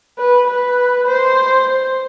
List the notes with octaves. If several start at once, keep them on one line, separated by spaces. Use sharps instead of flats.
B4
B4
C5